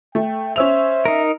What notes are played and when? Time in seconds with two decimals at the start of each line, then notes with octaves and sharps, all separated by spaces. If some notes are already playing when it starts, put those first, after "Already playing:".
0.15 A3 G5
0.56 C#4 C5 E5 E6 F7
1.05 D#4 A#4